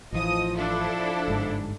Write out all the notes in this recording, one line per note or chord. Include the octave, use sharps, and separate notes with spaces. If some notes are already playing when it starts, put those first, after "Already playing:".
A1 E3 F3 D#5 D#6
D4 E4 A4
G1 G#2